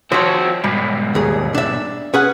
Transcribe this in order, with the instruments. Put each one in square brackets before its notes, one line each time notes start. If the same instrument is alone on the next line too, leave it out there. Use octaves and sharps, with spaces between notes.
[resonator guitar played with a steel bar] F3 C#5 [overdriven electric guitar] C4 F#4 [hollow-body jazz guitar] C5
[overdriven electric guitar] G#2 B2 [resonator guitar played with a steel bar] G3
[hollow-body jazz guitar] D#2 G#4
D4 E5
[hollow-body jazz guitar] C#4 G#4 F#5 [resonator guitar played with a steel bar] B4